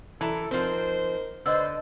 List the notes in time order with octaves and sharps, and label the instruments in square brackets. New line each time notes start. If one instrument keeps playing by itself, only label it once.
[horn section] F#2 E4 A4 [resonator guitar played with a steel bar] E3 [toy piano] A5 A#5
[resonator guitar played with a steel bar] F3 C4 [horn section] D#4 A#4 C5
[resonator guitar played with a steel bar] D3 [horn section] B4 C5 [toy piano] D#5 F#5 E6